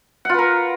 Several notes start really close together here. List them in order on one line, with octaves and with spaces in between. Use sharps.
F#5 F4 B4 A#4